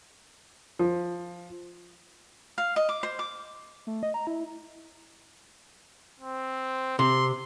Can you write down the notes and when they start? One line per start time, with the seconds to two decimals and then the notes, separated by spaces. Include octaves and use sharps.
0.79 F3
2.58 F5
2.76 D#5
2.89 D6
3.03 C5
3.19 D6
3.87 A3
4.03 D#5
4.14 A#5
4.27 E4
6.20 C4
6.99 C3 C6